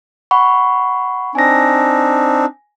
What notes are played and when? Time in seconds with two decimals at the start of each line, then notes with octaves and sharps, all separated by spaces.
0.31 F#5 B5 C#6
1.35 C4 D4 D#4 G#5 A#6